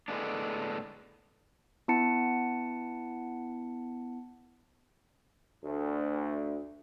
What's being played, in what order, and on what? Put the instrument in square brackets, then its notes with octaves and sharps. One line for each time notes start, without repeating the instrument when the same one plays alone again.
[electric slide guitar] A2 D3 E3 G#3 B3 D4
[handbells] B3 E4 F#5 A5 C#7
[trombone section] D2